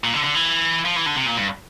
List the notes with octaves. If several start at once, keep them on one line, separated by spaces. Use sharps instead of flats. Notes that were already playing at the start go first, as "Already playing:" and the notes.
A#2
D3
D3
E3
F3
E3
D3
C3
A#2
G2